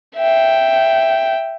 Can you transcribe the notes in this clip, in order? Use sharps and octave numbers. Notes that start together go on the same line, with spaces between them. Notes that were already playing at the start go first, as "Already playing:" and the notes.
E5 G5